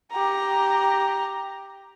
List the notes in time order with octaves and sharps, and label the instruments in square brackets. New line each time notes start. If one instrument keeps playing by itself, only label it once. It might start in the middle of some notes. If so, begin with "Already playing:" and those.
[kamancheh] G4 A#5